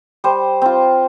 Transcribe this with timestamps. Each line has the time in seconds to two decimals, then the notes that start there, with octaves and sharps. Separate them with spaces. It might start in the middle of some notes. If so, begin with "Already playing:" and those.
0.24 G3 C5
0.62 C4 F4